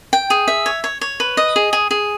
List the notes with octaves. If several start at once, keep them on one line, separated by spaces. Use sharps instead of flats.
G5
G#4
E5
C#5
C#5
C#5
B4
D#5
G#4
G#4
G#4